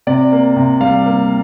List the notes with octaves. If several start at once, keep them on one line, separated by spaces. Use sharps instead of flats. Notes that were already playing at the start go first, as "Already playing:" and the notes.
C3 D5
A#3
C3
G3 F5
A#3